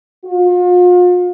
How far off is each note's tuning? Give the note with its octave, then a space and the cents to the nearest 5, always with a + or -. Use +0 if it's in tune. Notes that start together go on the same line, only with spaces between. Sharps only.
F4 +40